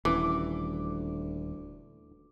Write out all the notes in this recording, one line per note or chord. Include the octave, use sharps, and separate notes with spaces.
D#1 D2 E3 C#4 D6